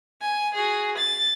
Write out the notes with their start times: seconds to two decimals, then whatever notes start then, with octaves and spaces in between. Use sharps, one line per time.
0.22 G#5
0.54 F#4 G#4
0.97 A6